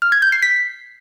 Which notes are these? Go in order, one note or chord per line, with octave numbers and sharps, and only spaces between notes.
F6
G#6
G6
C7
B6